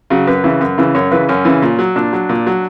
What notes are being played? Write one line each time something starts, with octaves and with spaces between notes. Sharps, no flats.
C#3 F#3
F#2 B4
C#3 E3
F#2
C#3 E3
F#2 C#5
C#3 E3 B4
F#2 C#4
C#3 E3
A#2
F#3
A#2 D4
F#3
A#2
F#3